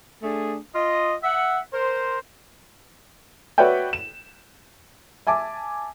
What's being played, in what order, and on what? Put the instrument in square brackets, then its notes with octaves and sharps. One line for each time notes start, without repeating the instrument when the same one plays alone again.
[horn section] A3 D4 G#4
F4 D#5
E5 F#5
A#4 C5
[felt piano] F#4 B4 C#5 D5 E5 G5
E7
E5 G#5 A5 D6